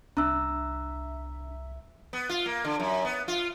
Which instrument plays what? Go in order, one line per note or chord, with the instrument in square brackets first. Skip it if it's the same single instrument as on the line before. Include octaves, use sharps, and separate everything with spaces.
[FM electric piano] C2 E5 [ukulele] D4 [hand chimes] A#5 E6
[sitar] B3
F4
A#3
D3
F#2
B3
F4